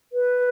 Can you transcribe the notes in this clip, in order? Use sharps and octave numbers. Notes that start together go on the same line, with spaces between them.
B4